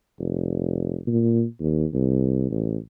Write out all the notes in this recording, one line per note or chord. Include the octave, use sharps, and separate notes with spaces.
F1
A#2
D#2
C2
A1